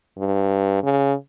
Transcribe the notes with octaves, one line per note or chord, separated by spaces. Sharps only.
G2
C#3